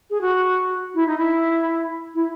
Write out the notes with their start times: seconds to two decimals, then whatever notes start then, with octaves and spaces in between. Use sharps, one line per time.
0.10 G#4
0.21 F#4
0.95 E4
1.07 D#4
1.18 E4
2.15 E4